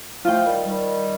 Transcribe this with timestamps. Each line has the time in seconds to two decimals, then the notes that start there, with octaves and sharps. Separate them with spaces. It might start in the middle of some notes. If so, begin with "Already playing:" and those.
0.25 F3 A3 F4 C5 G5
0.45 D#3 G3
0.66 D#3 G3